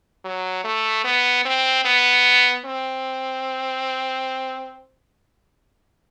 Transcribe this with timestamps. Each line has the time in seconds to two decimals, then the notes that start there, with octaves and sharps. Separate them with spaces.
0.24 F#3
0.64 A3
1.05 B3
1.45 C4
1.85 B3
2.65 C4